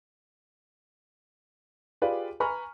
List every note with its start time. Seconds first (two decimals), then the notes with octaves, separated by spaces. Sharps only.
2.02 F4 G4 G#4 B4 D5 F5
2.40 B4 G#5 A#5 B5 C#6 F6